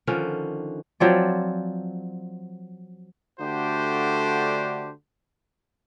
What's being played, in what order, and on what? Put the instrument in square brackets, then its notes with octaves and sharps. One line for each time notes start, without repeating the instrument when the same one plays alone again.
[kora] D3 D#3 F3 C#4
F3 F#3 C4 D5
[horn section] D3 A3 D4 F#4 G4 C5